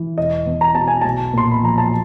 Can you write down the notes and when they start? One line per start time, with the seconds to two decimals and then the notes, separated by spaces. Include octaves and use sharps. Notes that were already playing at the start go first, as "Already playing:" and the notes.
Already playing: E3
0.18 E1 D#5
0.46 E2
0.61 A#5
0.75 B2 A5
0.88 G#5
1.01 B1 A5
1.33 A#2 C6
1.51 B5
1.62 F3 A#5
1.78 A5